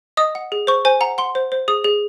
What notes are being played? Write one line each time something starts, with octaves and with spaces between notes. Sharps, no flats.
D#5 D#6
F#5
G#4
C5 C#6
C5 G#5
F#5 A#5
F#5 C6
C5
C5
G#4 D#6
G#4